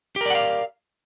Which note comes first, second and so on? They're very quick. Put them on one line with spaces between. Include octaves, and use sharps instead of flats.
G4 A#4 D5 F#5 F5